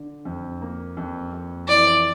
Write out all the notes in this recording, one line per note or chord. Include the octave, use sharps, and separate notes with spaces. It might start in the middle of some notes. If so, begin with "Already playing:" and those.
Already playing: D3
F2
A#3
F2
F2
E3 D5